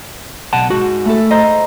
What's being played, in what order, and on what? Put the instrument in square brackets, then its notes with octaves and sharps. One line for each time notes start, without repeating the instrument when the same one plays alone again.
[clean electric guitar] B1 F#5 A5
[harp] G#2 [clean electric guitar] F#4
[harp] A3 E4 A4
[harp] C5 A#5 [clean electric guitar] D#5